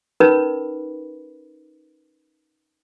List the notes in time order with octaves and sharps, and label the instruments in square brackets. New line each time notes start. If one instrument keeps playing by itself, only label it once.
[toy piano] C#4 D#4 A#4 B4 B5